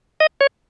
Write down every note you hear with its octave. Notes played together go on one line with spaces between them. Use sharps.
D#5
C#5